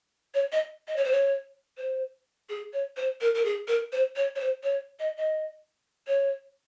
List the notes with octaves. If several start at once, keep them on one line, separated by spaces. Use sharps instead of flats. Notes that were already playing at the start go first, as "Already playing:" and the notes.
C#5
D#5
D#5
C#5
C5
C#5
C5
G#4
C#5
C5
A#4
A#4
G#4
A#4
C5
C#5
C#5
C5
C#5
D#5
D#5
C#5